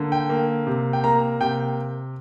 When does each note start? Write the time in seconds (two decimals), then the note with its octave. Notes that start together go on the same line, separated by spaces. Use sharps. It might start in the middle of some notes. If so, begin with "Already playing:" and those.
Already playing: D3 A#3
0.12 G5
0.30 A#3
0.67 C3
0.93 G5
1.04 A#3 A#5
1.41 C3 G5